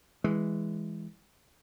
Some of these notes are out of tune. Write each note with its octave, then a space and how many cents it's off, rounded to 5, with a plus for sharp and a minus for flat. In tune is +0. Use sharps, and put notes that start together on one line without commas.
E3 +0 G#3 -5